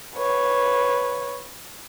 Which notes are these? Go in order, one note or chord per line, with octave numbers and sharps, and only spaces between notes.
B4 C#5